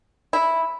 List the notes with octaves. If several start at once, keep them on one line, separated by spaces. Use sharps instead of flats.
E4